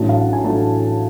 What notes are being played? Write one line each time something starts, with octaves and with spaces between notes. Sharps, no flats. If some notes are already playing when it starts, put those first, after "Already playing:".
Already playing: A1 A2 F#3 A3 D4 A5
F5
F#5
G#5
A2 F#3 A3 D4 A5